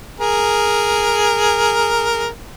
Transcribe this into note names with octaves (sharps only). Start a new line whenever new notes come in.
G#4 A#4